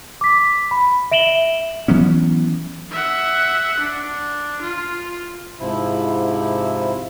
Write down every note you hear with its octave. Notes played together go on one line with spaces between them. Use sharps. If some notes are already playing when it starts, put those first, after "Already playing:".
D6 B6
B5
E5 D7 E7 F#7 G7
E3 F#3 B3 C#4
E5 F#5
D4
F4
G#2 C3 F3 E4